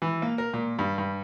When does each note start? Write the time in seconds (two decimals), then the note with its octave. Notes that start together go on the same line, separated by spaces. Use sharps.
0.02 E3
0.22 A#3
0.38 A#4
0.54 A#2
0.79 G2
0.98 G2